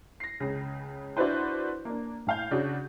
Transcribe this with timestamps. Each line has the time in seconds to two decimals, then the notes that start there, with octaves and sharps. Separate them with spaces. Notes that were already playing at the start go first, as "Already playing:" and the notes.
0.20 A#6 C7
0.40 C#2 C#3
1.17 D4 E4 F#4 B4 C5
1.85 A#3 D4
2.27 A2 F5 G6
2.51 C#3 D4 F#4